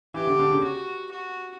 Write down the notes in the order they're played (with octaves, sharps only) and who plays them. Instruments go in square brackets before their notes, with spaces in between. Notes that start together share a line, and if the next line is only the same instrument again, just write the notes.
[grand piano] E3 [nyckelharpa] G4
[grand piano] D3
D3
C#3
[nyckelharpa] F#4
F#4